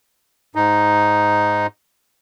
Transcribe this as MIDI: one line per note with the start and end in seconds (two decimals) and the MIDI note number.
0.55 1.67 44
0.55 1.67 63